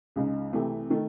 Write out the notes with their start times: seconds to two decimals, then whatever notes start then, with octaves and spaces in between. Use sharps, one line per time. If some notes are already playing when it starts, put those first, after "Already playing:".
0.16 C#2 C#3 G#3 D#4
0.53 C2 C3 E3 A3 C4
0.90 D#3 A3